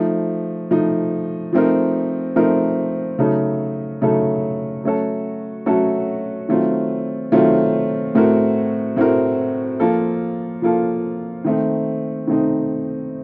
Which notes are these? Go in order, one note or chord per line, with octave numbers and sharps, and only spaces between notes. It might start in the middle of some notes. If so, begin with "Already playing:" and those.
Already playing: F3 A3 D#4
F3 A3 D#4
F3 A3 C4 D#4 A#4
F3 A3 C4 D#4 A#4
C#3 F#3 A3 D#4 A4
C#3 F#3 A3 D#4 A4
F#3 A3 C#4 F#4 A4
F#3 A3 C#4 F#4 A4
D#3 F#3 A3 C4 F4
D#3 F#3 A3 C4 F4
A2 A3 C4 F#4 A#4
A2 A3 C4 F#4 A#4
F3 A#3 F4 A4
F3 A#3 F4 A4
D#3 A3 C4 D#4
D#3 A3 C4 D#4